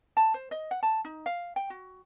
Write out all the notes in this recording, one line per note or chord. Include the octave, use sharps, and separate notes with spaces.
A5
C5
D#5
F#5
A5
D#4
F5
G5
F#4